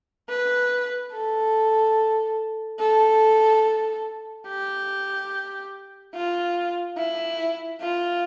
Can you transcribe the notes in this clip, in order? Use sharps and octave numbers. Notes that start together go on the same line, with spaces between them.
B4
A4
A4
G4
F4
E4
F4